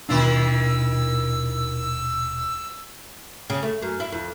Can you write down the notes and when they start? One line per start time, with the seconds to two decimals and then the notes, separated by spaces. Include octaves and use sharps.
0.09 D#1 B2 D#3 D4 E4 F4 E6
3.50 C#3
3.63 A3
3.82 F#2
4.00 E4
4.12 F2